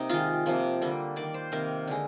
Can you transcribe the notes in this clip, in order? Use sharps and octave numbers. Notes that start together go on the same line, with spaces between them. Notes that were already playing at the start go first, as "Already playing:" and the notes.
Already playing: C3 A#3 D#4
D#3 G#3 F4
C3 F3 A#3
D3 G3 A#3
D#3 A#3 D5
C5
C3 D#3 A#3 A#4
D3 G#3